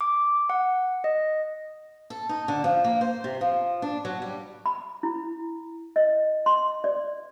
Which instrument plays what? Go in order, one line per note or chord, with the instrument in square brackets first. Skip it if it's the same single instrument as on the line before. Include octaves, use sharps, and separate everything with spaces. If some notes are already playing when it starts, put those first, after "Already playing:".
[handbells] D6
F#5
D#5
[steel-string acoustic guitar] A4
D#4
D3
F3
A#3
C5
C3
F3
D4
F#3
G3
[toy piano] B5
E4
D#5
C6
D5